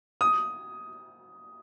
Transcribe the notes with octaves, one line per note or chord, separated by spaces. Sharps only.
D#6